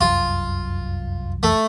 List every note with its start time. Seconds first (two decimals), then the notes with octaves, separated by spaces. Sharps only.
0.01 F1 C2 F#2 F4
1.43 A3